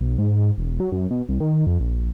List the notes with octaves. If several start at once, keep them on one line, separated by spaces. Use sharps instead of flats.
B1
G#2
G#2
E1
F#3
F#2
B2
C2
D#3
F2
A#1